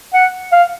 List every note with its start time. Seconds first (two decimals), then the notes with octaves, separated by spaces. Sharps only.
0.14 F#5
0.52 F5